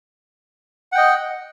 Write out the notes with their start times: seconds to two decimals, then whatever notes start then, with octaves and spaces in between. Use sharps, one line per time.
0.92 F#5
0.95 G5
0.98 D#5